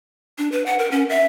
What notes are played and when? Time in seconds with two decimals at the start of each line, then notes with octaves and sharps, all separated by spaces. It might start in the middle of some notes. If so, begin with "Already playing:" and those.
0.38 D4
0.52 B4
0.66 F#5
0.79 A#4
0.91 C#4
1.09 E5